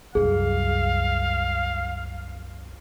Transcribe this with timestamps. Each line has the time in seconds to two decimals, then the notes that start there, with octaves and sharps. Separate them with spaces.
0.15 C2 F#2 G#4 F5